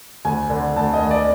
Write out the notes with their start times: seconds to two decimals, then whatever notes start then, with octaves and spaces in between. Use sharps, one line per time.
0.25 D2 G#5
0.50 D3
0.76 D2 A5
0.94 D#5
1.02 D2
1.11 D5